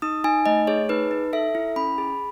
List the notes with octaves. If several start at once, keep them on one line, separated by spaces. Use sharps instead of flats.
D#4 D#6
D#4 G#5
A3 D#5
G#4 C#5
D#4 B4
D#4
A4 E5
E4
C#4 B5
G#4